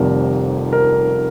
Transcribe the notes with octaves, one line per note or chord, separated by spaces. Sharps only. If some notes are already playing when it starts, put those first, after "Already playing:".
Already playing: F1 F2 C3 D#3 G3 A#4
A#4